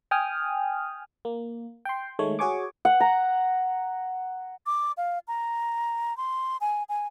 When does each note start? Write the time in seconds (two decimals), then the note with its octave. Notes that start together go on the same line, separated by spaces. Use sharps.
0.11 G5 G#5 D#6 F6
1.25 A#3
1.85 G5 C6
2.19 D#3 G#3 A3 C#5
2.39 F#4 G#4 C#5 G#5 C#6 D6
2.85 F#5
3.00 A#5
4.66 D6
4.97 F5
5.28 A#5
6.17 C6
6.61 G#5
6.89 G#5